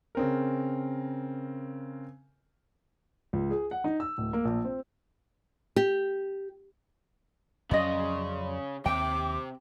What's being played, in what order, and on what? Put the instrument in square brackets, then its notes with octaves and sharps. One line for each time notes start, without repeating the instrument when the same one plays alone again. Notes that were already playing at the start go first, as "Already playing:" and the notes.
[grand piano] C#3 C4 A#4
C#2
G#4
F#5
D#4
E6
D1
A#3
A#1
C4
[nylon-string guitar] G4
[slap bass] F2 F#3 C#4 [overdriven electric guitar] C#3 [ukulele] D5 D#5 [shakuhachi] C6
[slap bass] D#2 [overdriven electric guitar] C3 [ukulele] G5 [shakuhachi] D6